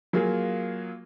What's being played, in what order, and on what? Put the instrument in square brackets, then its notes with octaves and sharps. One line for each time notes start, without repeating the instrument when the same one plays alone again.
[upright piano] F#3 A#3 F4 G#4